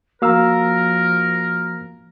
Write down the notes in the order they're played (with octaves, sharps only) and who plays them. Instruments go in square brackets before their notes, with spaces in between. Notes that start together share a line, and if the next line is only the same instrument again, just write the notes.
[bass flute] F3 [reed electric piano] A#3 F5 E6 [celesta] F#4 A#5 [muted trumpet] A#4